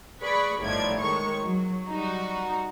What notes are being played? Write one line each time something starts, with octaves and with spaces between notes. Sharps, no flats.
G#4 B4 D5 B5 C#6
G1 A2 F3 D#4 D5 G#6
D#3 G#3 C#5 C#6
F#3
G3 D#4 F#4